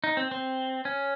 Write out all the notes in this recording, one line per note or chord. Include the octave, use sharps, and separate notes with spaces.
D#4
C4
C4
C#4